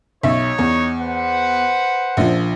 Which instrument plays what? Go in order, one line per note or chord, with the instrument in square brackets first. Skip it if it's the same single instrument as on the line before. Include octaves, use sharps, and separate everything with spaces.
[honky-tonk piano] B1 E5 [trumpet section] D#4 C#5
[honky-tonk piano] E2
[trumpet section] B4 C5 F#5
[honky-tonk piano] A#1 F3